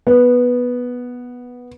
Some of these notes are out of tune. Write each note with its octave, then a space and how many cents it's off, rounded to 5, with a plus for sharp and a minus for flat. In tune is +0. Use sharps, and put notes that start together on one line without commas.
B3 -5